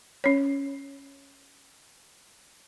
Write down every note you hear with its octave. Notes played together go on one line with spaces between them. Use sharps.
C#4 C#5